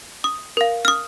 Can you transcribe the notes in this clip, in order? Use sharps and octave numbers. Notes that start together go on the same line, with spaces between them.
D#6
A#4 F5
F6
D#6